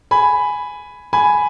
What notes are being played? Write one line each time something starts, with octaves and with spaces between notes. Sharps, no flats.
G#5 B5
G#5 B5